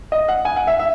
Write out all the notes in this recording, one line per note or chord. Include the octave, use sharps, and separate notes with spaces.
D#5
F#5
G#5
F#5
E5
E5